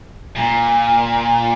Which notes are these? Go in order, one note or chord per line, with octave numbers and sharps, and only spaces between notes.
A#2